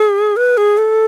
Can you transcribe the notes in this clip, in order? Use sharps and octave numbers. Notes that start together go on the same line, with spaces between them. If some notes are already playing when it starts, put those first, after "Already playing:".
Already playing: G#4
B4
G#4
A4